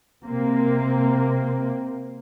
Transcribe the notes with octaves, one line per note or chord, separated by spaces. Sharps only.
C3 A#3 C4